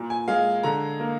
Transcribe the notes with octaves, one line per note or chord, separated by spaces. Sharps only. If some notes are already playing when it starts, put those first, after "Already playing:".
Already playing: A#2
G#5
G#3 F5
D3 A#5
A#3